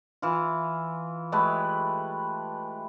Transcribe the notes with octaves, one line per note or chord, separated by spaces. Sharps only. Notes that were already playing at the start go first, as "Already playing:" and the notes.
E3 F4
G#3 A3 G4 B4